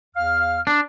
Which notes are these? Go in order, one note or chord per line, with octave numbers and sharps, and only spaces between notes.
E2 F5 F6
D4